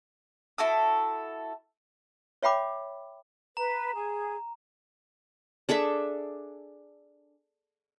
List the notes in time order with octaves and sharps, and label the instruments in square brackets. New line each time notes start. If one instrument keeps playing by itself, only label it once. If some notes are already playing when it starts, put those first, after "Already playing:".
[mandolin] E4 F#4 A4 D#6
[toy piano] C#5 E5 G5 B5 D6
[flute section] B4 [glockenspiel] A#5
[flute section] G#4
[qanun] D4 G#4 A4 E5